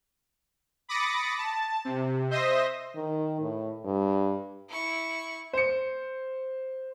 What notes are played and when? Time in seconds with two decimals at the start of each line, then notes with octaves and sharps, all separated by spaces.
0.89 B5 D6 D#6 A6 A#6 C#7
1.38 A5
1.85 C3
2.31 C5 D#5 E5 C6 D#6 A#6
2.96 D#3
3.41 A2
3.84 G2
4.69 E4 C#6
5.53 C5 C#7